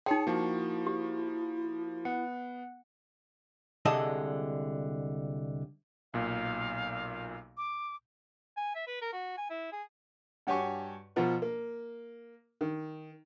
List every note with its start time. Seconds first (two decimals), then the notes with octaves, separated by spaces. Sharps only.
0.06 D#4 G#4 C#5 G5 A5 D#6 C#7
0.27 F3 A#3 E4 F#4
0.87 G4
2.05 B3 F#5
3.85 C2 D3 G#3 A4 D#5 A5
6.14 B1 A#2 F5
7.57 D6
8.57 G#5
8.75 E5
8.87 B4
9.02 A#4
9.13 F#4
9.38 G#5
9.50 E4
9.72 G#4
10.47 G2 F#4 G4 C#5 G#5 C#6
11.16 B2 F3 F4 A#4 F#5
11.42 A#3
12.61 D#3